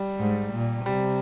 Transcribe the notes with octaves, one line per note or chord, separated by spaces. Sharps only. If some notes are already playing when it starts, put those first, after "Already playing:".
Already playing: G3
G#2
A#2
C3 G3